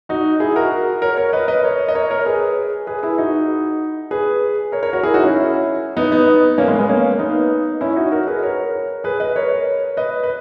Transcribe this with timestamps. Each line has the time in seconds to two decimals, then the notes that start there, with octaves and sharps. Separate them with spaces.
0.09 D#4 F#4
0.40 E4 G#4
0.56 F#4 A#4
1.02 A#4 C#5
1.17 A#4 C#5
1.33 B4 D#5
1.48 B4 D#5
1.63 A#4 C#5
1.88 D#5
1.95 A#4 C#5
2.10 A#4 C#5
2.25 G#4 B4
2.87 G#4 B4
3.03 E4 G#4
3.18 D#4 F#4
4.11 G#4 B4
4.72 A#4 C#5
4.82 A#4 C#5
4.93 F#4 A#4
5.03 E4 G#4
5.14 D#4 F#4
5.24 C#4 E4
5.97 B3 D#4
6.11 B3 D#4
6.58 A#3 C#4
6.68 G#3 B3
6.78 G#3 B3
6.89 A#3 C#4
7.19 B3 D#4
7.81 C#4 E4
7.96 D#4 F#4
8.12 F#4 A#4
8.27 G#4 B4
8.43 A#4 C#5
9.04 G#4 B4
9.20 B4 D#5
9.36 A#4 C#5
9.97 B4 D#5
10.24 B4